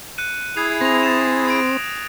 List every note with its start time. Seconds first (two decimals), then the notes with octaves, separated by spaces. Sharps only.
0.18 F#6 C#7 D#7
0.57 E4 G#4 G#6 C7 F7
0.81 C4 A#6 F7
1.03 A6 E7
1.48 D#6 D7